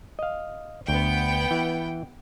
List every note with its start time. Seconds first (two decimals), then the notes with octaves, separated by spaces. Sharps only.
0.19 D#5 F5
0.88 D2 B3 G5
1.51 E3 F#5